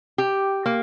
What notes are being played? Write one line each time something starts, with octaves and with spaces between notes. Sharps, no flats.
G4
A#3